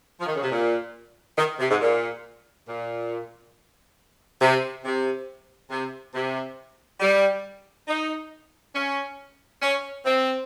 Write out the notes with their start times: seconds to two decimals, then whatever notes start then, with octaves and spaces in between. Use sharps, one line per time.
0.19 F3
0.26 D#3
0.35 C#3
0.42 C3
0.50 A#2
1.37 D#3
1.59 C3
1.69 G#2
1.81 A#2
2.67 A#2
4.40 C3
4.84 C3
5.70 C3
6.14 C3
7.00 G3
7.87 D#4
8.74 C#4
9.61 C#4
10.05 C4